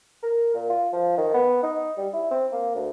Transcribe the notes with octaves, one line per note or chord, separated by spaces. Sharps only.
A#4
A#2
F4
F3
D#3
B3
D#4
G3
E4
C4
A#3
D2